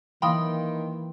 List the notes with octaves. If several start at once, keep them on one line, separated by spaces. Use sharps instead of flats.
D#3 E3 A#3 F5 G5 B5 C6 D#6